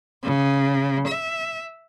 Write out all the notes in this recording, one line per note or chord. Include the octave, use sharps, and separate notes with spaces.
C#3
E5